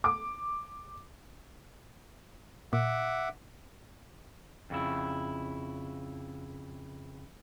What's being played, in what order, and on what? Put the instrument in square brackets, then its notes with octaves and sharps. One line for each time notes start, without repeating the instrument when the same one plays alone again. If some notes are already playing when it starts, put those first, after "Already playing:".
[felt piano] D6
[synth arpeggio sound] A#2 [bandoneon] E5 F#5 D6
[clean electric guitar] F2 C#3 E4